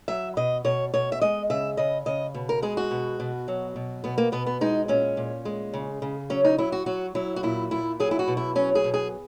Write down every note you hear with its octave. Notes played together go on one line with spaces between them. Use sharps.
F#3 E5
B2 D#5
B2 C#5
B2 C#5
E5
G#3 D#5
C#3 E5
C#3 D#5
C#3 D#5
B2
A#4
G#3 G#4
F#4
B2
B2
F#3
B2
B2 B3
A#3
B2 B3
B3
G#3 D#4
A#2 C#4
A#2
G#3
C#3
C#3
F#3 C#4
D#4
F#3 E4
F#4
F#3 F#4
F#3 E4
F#4
A#2 E4
A#2 E4
F#3 G#4
E4
F#4
B2
E4
F#3 C#4
G#4
B2
G#4